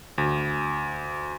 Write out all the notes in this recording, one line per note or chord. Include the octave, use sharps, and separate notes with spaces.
D2